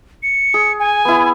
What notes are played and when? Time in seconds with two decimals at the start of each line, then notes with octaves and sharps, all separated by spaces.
0.23 C#7
0.54 G#4
0.79 G#5
1.05 B3 E4